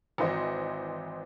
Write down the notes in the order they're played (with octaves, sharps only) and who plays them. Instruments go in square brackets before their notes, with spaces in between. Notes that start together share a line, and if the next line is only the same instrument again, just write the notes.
[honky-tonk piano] G#1 E3 C5 D#5